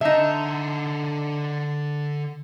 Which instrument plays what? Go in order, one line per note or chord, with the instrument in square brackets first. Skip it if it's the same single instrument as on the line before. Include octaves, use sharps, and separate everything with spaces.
[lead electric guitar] D3 A5 [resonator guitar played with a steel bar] D#4 E5